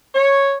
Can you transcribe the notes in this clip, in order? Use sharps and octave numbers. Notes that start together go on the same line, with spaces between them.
C#5